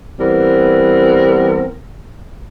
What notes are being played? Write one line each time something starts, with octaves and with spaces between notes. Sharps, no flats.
E3 G3 B3 C4 A#4